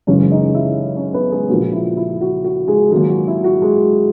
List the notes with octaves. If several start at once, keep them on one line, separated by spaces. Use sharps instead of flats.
F#1 F#2 C#3 E3 G#3 C#4 C#5
D#4 D#5
E4 E5
C#4 C#5
B3 B4
G#3 G#4
A#1 A#2 A#3 F#4
E4
E4
F#4
F#4
G#3 G#4
G#1 G#2 F#3 G#3 A#3 G#4
F#4
E4
F#4
G#3 G#4